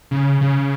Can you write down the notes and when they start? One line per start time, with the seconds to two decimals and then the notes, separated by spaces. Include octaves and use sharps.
0.11 C#3
0.41 C#3